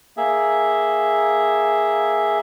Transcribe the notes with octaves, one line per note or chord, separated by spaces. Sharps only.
A#3 G#4 E5